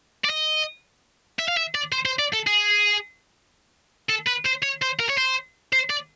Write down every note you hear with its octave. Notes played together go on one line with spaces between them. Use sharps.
D5
D#5
E5
F5
E5
D5
C5
C5
D5
A4
G#4
A4
B4
C5
C#5
C5
A#4
C#5
C5
C5
D5